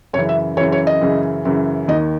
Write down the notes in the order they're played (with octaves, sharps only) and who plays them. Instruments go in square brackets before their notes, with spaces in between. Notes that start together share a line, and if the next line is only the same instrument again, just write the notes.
[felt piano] F#2 C#3 E3 C#5
E5
F#2 C#3 E3 C#5
C#5
D#5
F#2 C#3 E3
F#2 C#3 E3
D#2 D#3 D#5